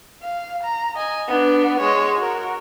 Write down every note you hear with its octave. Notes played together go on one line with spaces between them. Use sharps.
F5
A#5
D#5 G#5
B3 D4
G#3 C#5
F#4 A#4